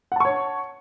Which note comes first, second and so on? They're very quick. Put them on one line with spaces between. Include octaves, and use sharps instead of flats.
F#5 A5 C#6 C#5